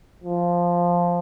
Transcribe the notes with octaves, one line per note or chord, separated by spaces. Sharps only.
F3